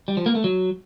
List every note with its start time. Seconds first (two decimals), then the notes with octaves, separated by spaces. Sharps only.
0.08 G3
0.17 F3
0.26 A#3
0.35 A3
0.44 F#3